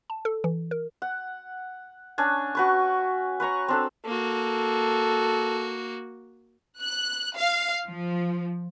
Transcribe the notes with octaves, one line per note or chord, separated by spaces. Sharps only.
A5
A4
E3
A#4
F#5
C#4 D4 G#5
F#4 B4 C#6
B4 C#5 A#5 C#6
C4 D4 A4
A#3 F#4 A4
F#6
F5
F3